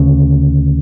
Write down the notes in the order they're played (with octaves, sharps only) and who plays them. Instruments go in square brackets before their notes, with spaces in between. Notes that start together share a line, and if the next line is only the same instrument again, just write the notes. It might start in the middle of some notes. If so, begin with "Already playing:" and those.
Already playing: [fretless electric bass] D2 C#3